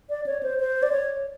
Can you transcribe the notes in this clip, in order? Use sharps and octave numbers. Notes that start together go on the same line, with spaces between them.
D5
C#5
C5
C5
D5
C#5